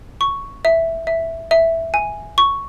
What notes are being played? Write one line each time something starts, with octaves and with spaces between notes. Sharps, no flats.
C#6
E5
E5
E5
G#5
C#6